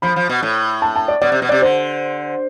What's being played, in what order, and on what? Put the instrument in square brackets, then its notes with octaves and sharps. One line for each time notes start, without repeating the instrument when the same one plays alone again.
[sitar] F3 [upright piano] B5
[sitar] F3
B2
A2
[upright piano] A5
A5
D5
[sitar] B2 [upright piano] D5
[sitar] C3
B2
[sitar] C3 [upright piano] D5
[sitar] D3 [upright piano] C5